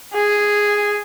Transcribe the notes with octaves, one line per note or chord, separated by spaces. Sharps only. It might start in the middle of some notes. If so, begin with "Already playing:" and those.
G#4